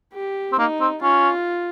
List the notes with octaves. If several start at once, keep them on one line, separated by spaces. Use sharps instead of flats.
G4
C4
A#3 D#4
C4
C#4 F4